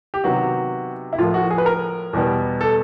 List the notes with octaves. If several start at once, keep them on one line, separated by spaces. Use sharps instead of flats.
G4
C3 D#3 F#3 B3 F#4
E4
A2 F3 A#3 F4
F#4
G#4
B4
A#4
E2 B2 G3 B3
A4